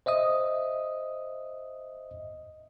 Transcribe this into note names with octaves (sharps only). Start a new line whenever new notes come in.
C5 D#5 E5 D#6